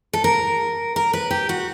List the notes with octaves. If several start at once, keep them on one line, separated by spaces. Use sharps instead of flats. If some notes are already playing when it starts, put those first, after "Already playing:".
A4
A#4
A#4
B4
G4
F#4